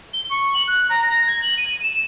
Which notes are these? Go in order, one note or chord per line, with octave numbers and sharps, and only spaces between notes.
G7
C#6
F#7
F#6
A#5
A#6
G#6
F#7
D#7
E7